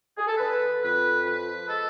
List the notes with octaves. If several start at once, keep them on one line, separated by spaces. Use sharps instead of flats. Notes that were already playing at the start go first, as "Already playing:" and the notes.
G#4
A4
D3 B4
F2 B4
F3 B4
G#3 A4